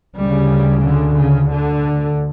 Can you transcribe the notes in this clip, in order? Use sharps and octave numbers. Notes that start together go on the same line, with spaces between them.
D2 C#3 G3
D3
C#3
D3